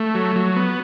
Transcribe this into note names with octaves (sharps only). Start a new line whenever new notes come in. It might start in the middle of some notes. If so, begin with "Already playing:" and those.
Already playing: A3
F#3
F#3
B3